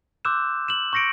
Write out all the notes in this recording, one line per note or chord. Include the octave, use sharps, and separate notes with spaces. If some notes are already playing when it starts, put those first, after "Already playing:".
C6 D6 E6 F#6 G6 E7
E7 F#7
C#6 G6 A#6 C#7 D7